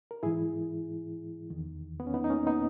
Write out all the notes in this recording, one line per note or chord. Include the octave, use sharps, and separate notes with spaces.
A#4
G#2 E3 E4 G#4
E2 D#3
B3
C#4
B3 D#4
D#4
A#3 C#4
B3 D#4